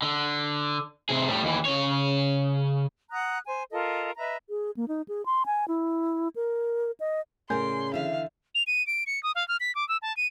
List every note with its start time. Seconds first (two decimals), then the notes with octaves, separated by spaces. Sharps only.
0.02 D3
1.09 C3 G#4
1.28 A2 G3
1.43 D#2 E3
1.65 C#3 C#5
3.11 F#5 A#5 D#6 F#6
3.46 C5 G#5
3.72 F4 A4 A#4 D#5
4.17 B4 D#5 E5 A#5
4.49 G#4
4.77 A#3
4.88 D#4
5.08 G#4
5.26 C6
5.46 G#5
5.68 E4
6.36 A#4
7.00 D#5
7.50 A2 C#3 A#4 D5 G#5 C6 G6
7.94 D3 E3 E5 F5
8.55 F7
8.67 D#7
8.87 D7
9.07 C#7
9.23 D#6
9.35 F5
9.48 F6
9.60 B6
9.75 D6
9.89 E6
10.02 A5
10.17 D#7